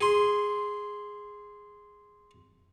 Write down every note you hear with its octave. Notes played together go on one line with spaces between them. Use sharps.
G#4 C6